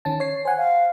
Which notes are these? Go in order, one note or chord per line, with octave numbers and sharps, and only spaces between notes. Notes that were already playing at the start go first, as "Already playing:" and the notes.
D#3 C#4 A5
C#5 C7
C5 F#5 G#5
F5